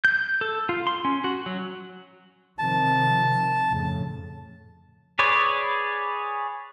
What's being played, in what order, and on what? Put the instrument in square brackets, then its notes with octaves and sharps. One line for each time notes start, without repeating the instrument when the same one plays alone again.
[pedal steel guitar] G6
A4
F4
C6
C#4
F#4
F#3
[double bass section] C3 D#3 F3 [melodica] A5
[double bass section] F2 A2 C#3
[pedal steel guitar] G#4 B4 C#5 D5